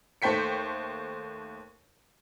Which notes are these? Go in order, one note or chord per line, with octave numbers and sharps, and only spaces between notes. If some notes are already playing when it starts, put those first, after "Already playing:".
D#2 A3 C5 G5 B6 C#7